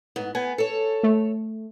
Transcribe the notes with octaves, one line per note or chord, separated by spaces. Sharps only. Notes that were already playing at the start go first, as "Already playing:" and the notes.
G#2 B3
B3 G#5
A4 C#5
A3